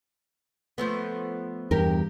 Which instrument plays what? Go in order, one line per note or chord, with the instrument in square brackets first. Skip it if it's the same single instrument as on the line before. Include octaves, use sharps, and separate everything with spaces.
[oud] F3 A3 B3
[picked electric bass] E2 G2 [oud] G4 A#4